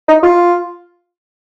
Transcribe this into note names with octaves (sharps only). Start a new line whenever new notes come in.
D#4
F4